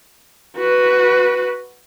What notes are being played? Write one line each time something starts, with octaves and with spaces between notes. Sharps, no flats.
F#4 B4